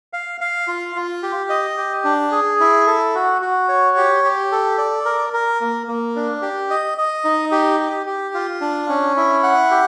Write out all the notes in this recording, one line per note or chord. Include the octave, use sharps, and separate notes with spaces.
F5
F5
F4
F4
G4
D#5
G4
D4
G#4
E4
A4
F#4
F#4
C#5
G4
G4
A4
D5
A#4
A#4
A#3
A#3
D4
G4
D#5
D#5
D#4
G4
G4
G4
F4
D4
C#4
E4
F#5
G4